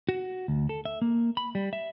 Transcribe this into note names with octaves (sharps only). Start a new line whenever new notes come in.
F#4
D2
A4
E5
A#3
B5
G3
E5